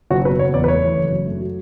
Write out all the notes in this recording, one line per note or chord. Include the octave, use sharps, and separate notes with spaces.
F#1 F#4
B2 B4
F#1 C#5
E2 D5
B4
A3 C#5
E3
F#1
F#2
A3
F#3